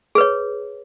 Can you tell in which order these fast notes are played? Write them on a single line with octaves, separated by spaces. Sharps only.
G#4 B4 C#5